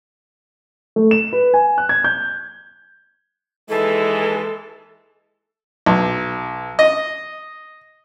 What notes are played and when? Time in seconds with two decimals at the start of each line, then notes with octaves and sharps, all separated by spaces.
0.96 A3
1.11 E7
1.33 B4
1.54 G#5
1.78 F#6
1.89 G#6
2.04 G6
3.69 D#2 E3 G#3 A4
5.86 B1
6.79 D#5